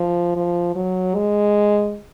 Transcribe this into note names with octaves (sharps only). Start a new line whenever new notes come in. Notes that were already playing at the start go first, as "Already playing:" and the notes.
Already playing: F3
F3
F#3
G#3